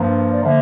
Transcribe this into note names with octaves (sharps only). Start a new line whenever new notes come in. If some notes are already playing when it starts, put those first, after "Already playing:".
Already playing: G2 F3 A#3
D5
D3 F3 A#3 E5